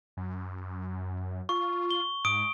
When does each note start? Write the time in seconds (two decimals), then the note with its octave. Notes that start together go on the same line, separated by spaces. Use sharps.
0.17 F#2
1.49 F4 C#6
1.91 G7
2.25 G#2 D#6 D7